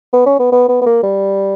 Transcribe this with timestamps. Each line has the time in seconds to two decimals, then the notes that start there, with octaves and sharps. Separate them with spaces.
0.13 B3
0.26 C#4
0.39 B3
0.52 B3
0.69 B3
0.82 B3
0.86 A#3
1.03 G3